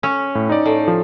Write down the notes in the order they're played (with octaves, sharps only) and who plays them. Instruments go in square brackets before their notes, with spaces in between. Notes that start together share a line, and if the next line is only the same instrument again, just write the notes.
[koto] C#4
[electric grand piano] A2
D#4 D5
[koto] A2
[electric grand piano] F3